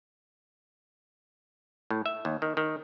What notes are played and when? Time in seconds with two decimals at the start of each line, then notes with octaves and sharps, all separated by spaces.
1.91 A2
2.06 E5
2.25 D#2
2.42 D#3
2.57 D#3